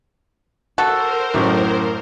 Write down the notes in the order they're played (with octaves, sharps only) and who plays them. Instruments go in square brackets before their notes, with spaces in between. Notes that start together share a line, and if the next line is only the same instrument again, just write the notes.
[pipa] F#4 A4 [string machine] A#4 C5
[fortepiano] A1 F#2 A2